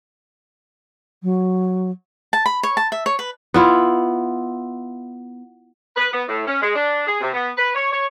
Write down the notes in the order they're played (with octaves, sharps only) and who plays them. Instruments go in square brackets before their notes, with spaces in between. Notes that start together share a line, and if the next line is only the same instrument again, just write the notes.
[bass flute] F#3
[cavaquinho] A5
B5
C#5
A5
E5
C#5
B4
[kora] B3 E4 F4
[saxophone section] B4
B3
A2
C#4
G#3
D4
G#4
C3
B3
B4
C#5
C#5